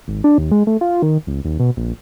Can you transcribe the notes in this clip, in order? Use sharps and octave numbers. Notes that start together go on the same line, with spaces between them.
G#1
D4
D#2
G#3
A3
F4
D#3
C#2
D#2
B2
A#1